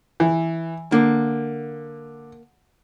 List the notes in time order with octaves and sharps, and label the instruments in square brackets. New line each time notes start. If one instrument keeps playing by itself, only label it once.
[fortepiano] E3
[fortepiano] D3 [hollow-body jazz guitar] A#3